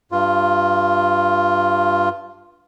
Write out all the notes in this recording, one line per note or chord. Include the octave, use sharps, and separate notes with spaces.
G2 F4